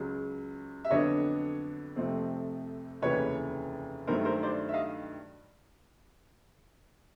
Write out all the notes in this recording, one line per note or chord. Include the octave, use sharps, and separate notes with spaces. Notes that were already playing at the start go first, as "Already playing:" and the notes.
Already playing: C#2 C#3 F#3
E5
F2 D3 F#3 B3 D4 C#5 D#5
F2 C3 F3 A3 C4
F1 D#2 C#3 E3 B4 C#5
G2 D#3 F#3 A3 A#4 C5
A#4 C5
C5 D5
E5
D#5 F5